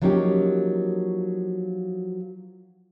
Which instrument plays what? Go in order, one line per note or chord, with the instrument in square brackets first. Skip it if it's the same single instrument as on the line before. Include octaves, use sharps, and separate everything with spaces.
[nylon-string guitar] F3 F#3 A#3 C#4 D#4 G4